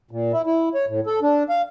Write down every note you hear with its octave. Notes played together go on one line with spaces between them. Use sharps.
A#2
E4
E4
C#5
A2
A4
D4
F5